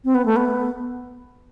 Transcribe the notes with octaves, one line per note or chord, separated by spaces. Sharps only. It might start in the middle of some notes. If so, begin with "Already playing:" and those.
C4
B3
A3
B3